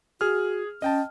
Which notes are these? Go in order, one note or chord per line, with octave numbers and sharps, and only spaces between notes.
F#4 G#4 F6
C#4 D#5 G5 A5